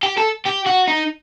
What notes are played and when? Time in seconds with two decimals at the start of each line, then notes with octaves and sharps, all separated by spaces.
0.03 G4
0.18 A4
0.46 G4
0.67 F#4
0.88 D#4